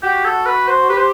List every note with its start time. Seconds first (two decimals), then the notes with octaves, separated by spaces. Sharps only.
0.03 F#4 G4
0.25 A4
0.46 B4
0.68 C5
0.89 G4 B4
0.97 C5